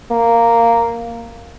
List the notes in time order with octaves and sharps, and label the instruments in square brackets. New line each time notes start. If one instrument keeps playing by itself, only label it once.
[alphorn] A#3